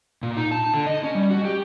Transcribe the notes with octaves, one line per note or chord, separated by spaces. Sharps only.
A#2
D#4
A5
D3
D#5
C#4
G3
F#4
G4